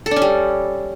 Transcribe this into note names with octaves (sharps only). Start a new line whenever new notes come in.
A4
D4
C#4
G3